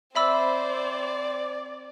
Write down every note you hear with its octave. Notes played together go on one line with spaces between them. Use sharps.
C4 C5 D5 E5 B5 E6